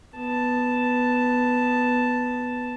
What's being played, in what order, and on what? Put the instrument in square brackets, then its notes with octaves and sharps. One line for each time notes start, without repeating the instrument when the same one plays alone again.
[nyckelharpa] B3 A5